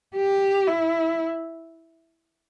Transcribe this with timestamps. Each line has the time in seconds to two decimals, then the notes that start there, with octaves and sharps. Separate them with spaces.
0.16 G4
0.67 E4